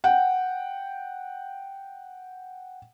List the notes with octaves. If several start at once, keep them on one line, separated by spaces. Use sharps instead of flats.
F#5 G5